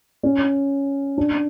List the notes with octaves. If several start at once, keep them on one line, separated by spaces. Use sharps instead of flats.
C#4
D4